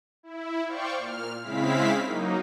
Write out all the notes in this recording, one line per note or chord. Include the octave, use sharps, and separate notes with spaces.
E4
C5 D5 F5 G5 C#6
A#2 F6
C#3 G#3 C4 E4 F5 B6
F#3 A#3 D#4